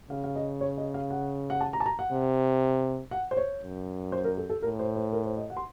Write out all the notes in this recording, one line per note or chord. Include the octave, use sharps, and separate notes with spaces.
C#3 F5
F5
D#5
C#5
D#5
F5
F#5
F#5
A5
A#5
A5
A#5
F#5
C3
F#5
C5
C#5
F#2
C5
A#4
A4
A4
A2 A#4
C5
C5
A#4
C5
D#5
F#5
C6